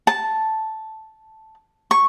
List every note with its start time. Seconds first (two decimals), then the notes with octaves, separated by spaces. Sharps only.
0.07 A5
1.91 C#6